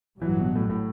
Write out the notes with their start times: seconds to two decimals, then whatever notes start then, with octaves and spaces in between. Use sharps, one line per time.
0.22 A1 G2 E3 F#3
0.39 B2
0.56 A2
0.70 A2